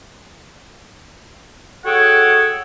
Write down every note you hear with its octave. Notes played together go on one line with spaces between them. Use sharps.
F#4 G#4 A4 C#5 F#5 G5